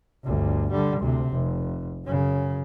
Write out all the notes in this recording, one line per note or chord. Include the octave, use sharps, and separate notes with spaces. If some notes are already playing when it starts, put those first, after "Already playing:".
G1 D2
D3 G3
D2 C3
F1
F#2 C#3